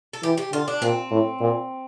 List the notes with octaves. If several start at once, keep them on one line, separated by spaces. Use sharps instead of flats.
A4
E3 G4
G4
D3 F4
D4
A#2 C4
A2
A#2